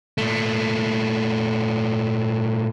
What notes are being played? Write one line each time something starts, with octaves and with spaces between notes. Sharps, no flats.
A#2 A3